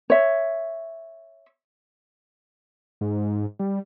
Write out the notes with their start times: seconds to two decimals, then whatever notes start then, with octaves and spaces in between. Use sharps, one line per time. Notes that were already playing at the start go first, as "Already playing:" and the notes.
0.10 C#5 E5
3.01 G#2
3.59 G3